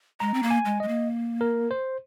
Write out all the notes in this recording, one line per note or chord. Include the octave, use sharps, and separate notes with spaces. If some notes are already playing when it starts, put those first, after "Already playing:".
G#3 A#5
C4
A#3
G#5
G#3
G#3 D#5
A#3
A#4
C5